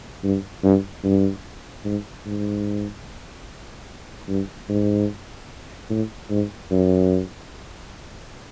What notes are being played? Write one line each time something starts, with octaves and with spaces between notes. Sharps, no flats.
G2
G2
G2
G#2
G#2
G2
G#2
A2
G#2
F#2